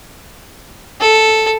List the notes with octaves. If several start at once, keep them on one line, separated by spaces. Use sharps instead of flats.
A4